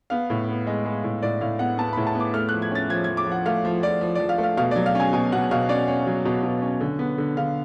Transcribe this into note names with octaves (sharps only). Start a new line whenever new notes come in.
B3 F5
A2
B3
G#3
G#3
A2
A2 D5
A2 F5
B3 F#5
B3 A5
B5
A2
A5
B3
D6
A3 F6
F#6
F3
G#6
C#4 A6
F3 G#6
G#6
F3
D6
F3 F#5
A3 F5
F3
F3 D5
F3
D5
F3
F5
A3
F5
B2 F5
D5
F#3
F5
C#4 G#5
B2 G#5
B2 F#5
B2 F5
C#4 D5
C#4
F#3
B2
B2
C#4
D3
B3
D3
D3 F5